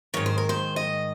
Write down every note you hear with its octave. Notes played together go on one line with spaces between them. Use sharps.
G#2 D#3 C#5
C5
A#4
C5
D#5